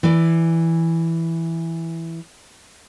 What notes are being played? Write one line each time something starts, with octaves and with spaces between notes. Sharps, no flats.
E3 E4 D5